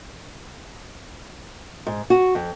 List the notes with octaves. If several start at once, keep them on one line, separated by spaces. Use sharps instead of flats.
G#2
F#4
F2